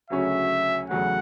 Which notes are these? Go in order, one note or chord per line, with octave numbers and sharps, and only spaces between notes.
D2 C#3 F#3 C#4 F#4 E5
E2 C#3 F#3 A3 F#5